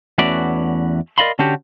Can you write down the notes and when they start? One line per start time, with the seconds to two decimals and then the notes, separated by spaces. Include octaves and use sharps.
0.18 E2 A3 C#4 F#4 B4 D5
1.18 A#4 D5 D#5 F5 B5 C6
1.39 D3 C#4 D4 F#4 G4